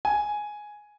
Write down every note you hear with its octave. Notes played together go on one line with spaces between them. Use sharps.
G#5